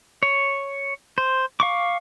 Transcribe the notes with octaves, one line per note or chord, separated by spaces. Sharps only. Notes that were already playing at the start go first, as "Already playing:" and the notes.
C#5
C5
F5 C#6 D6